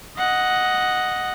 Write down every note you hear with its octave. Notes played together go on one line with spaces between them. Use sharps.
D#5 F#5